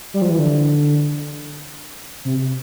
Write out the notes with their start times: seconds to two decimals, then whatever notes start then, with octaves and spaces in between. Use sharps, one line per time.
0.14 G3
0.22 F3
0.30 E3
0.39 D3
2.25 C3